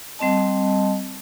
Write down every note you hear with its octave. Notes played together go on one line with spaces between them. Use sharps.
G3 C4 D#5 A5